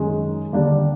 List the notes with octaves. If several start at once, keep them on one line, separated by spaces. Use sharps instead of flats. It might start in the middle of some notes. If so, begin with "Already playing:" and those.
Already playing: F#2 D#3 G#3
D#2 D3 G3 A#3 D4